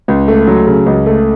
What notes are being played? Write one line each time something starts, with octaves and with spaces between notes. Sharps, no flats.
C#2
A3
F#3
C#3
C#2
A3